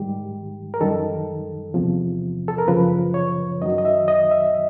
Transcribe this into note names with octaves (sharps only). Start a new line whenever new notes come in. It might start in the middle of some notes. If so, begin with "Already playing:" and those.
Already playing: G#2 D#3 G3 G4
A#4
F#2 D#3 G3 A4
E2 C3 F3
A4
A#4
F#2 C#3 F3 B4
C#5
F#2 D#3 F#3 D#5
D#5
E5
D#5
E5